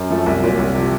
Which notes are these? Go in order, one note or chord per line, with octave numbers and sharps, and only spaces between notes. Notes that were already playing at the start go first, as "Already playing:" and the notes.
Already playing: F#2
F3 A3
C2
A#2 F#3
C2
C3 F3